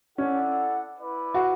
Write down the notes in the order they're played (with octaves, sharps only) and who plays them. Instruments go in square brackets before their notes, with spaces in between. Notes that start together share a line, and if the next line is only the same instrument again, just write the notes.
[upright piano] C#4 [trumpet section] E4 A4 D5 F#5
[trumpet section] E4 B4 D5
[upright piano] F#4